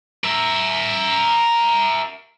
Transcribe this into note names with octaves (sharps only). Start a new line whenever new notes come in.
A#4 E5